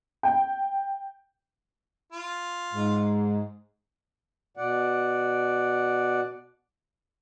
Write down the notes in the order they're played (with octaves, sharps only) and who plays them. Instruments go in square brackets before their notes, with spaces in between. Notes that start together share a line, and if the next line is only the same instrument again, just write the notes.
[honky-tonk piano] G5
[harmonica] F4
[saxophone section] G#2
[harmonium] B2 D5 F#5